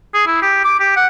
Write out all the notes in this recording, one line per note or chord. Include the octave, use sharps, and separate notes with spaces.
G#4
E4
G4
D6
G4
F#5